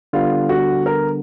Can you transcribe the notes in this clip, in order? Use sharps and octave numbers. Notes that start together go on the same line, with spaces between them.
D3 G3 B3 F4
F#4
A#4